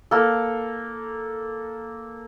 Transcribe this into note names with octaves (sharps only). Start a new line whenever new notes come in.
A#3 A4